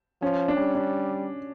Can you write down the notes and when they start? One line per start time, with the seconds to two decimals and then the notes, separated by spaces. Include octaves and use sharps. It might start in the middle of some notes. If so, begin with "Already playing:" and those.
0.22 F3 C#4
0.48 D4
0.57 G3 C#4
0.75 D4